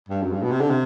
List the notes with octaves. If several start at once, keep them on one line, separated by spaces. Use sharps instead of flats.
G2
F#2
G2
B2
C3
D3
C3